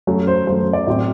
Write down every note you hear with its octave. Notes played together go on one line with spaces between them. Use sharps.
F#2 F#3 A3
C5
F#2 F#3 A3 C5
C5
D5
A2 F#3 C4 D5